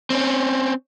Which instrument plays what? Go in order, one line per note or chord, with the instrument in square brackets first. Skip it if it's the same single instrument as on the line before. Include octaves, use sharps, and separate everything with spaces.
[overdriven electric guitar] C4 C#4